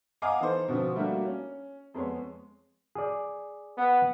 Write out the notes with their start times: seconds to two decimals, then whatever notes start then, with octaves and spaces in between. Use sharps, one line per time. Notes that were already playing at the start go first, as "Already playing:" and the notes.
0.22 D#5 F5 F#5 G#5 A#5 D6
0.40 E3 D#4 A4 C5
0.68 B2 D3 F3 B3 C4
0.95 G3 A3 A#3 D4 F#4
1.25 C#4
1.94 F2 G#3 B3 C#5
2.95 G#4 D5
3.77 B3